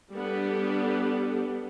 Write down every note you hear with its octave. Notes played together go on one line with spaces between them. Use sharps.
G3 B3 D4 A4